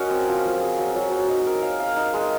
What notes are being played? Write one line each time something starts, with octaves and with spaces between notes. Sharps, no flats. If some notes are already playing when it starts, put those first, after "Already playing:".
Already playing: C#4 F#4 A#4 D#5
C4
F3
F3
G#4
F#3
F#3
F#3
D#4
A#4
F5
F5
D#4
G#3